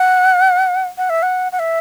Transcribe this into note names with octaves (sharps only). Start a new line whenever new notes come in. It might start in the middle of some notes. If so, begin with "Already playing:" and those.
Already playing: F#5
F#5
E5
F#5
F#5
E5